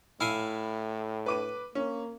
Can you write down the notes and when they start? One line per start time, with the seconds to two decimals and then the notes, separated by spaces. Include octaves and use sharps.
0.21 A2 E4 F5 G#5
1.26 B4 D6 D#7
1.75 A#3 C#4